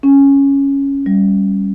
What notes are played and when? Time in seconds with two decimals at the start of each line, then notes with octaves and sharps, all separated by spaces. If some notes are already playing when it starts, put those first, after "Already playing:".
0.03 C#4
1.06 G3